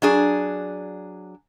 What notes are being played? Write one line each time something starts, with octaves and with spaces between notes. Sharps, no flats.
F#3 D4 G#4